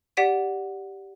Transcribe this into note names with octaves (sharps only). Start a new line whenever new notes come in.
G4 D5 F#5 B6 D7 D#7